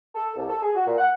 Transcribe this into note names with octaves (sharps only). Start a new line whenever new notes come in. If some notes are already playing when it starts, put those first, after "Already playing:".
A4
C2
A4
G#4
F#4
A#2
F#5